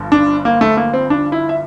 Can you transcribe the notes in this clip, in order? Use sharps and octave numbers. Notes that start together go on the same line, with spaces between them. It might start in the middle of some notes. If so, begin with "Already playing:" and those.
Already playing: G1 G2 F3
D4
A#3
A3
A#3
C4
D4
E4
E5